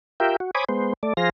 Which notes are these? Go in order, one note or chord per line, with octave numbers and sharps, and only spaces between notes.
F4 G4 A#4 E5 G5
F#4
C5 C#5 G#5 B5 D6 D#6
G#3 B3 C5
A3 D5
F3 G#4 C5 F5 A#6